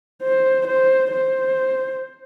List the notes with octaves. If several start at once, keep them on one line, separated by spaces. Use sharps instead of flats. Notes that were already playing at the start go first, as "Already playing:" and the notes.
C5
C5
C5